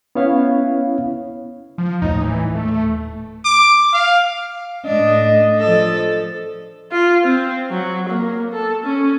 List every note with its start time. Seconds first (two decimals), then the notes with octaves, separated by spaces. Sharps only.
0.15 B3 C#4 E4 C#5 F5
1.78 F3
2.02 D#1 A2 D#4
2.22 E3
2.55 A3
3.45 D6
3.93 F5
4.85 A2 D4 D#5
5.59 F3 A4
6.92 F4
7.24 C4
7.70 F#3
8.09 A#3
8.53 A4
8.84 C#4